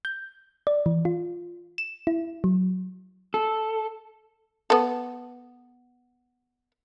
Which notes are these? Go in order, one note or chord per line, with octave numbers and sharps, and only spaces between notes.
G6
D5
E3
F4
E7
E4
F#3
A4
B3 A4